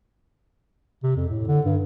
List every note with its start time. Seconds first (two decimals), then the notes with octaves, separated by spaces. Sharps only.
1.03 C3
1.16 F2
1.29 A2
1.48 D3
1.65 G2